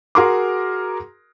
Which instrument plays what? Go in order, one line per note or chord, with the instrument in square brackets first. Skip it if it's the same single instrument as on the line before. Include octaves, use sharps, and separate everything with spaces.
[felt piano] F#4 G#4 A#4 C6 D6